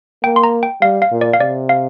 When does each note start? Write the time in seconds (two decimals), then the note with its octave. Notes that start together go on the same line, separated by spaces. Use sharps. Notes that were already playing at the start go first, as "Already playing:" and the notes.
0.24 A#3 G5
0.36 C6
0.43 A#5
0.63 G5
0.82 G3 F5
1.02 F5
1.11 A#2
1.21 D5
1.33 F5
1.40 C3 D5
1.69 F5